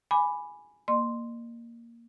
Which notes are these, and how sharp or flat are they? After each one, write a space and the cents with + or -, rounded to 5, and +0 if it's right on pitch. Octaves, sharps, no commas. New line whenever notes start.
G#5 +0 B5 +0 D6 +0
A#3 +0 D#5 -40 C6 +0